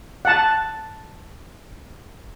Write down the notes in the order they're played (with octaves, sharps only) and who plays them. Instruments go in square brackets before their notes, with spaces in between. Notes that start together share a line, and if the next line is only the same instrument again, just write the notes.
[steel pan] F#5 A5